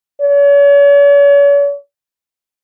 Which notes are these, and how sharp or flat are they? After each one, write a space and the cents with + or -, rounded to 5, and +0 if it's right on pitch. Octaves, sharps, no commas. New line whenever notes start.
C#5 +40